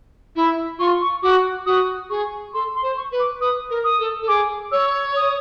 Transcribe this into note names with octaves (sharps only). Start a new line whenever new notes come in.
E4
F4 C#6
C#6
F#4 D6
F#4 D#6
G#4 C#6
A4 C6
C6
C5
C#6
B4
D6
B4 D#6
A#4
D#6
A4
A4
G#4 D6
C#5 E6
D#6